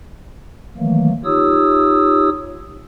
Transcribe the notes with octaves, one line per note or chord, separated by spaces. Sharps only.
D#3 E3 F#3 A3 A#3
D#4 F4 G4 C#5 D#6 E6